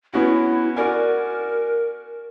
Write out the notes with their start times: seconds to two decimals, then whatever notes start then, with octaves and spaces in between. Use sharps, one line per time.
0.14 B3 C#4 E4 F#4
0.76 F#4 A#4 D5 G#5